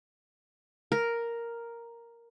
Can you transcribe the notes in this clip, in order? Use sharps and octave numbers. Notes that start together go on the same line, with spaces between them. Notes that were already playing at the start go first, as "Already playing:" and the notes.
A#4